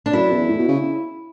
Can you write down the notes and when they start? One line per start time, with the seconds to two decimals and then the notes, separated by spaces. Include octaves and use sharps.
0.06 D4
0.13 F#2 E4
0.32 E2
0.50 A2
0.59 B2
0.68 C#3